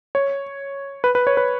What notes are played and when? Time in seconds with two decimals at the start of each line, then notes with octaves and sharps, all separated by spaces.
0.15 C#5
1.04 B4
1.15 B4
1.27 C#5
1.37 B4